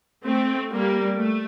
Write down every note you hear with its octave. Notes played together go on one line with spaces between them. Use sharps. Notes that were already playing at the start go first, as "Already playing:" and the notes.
A3 C4
G3 A#3
A3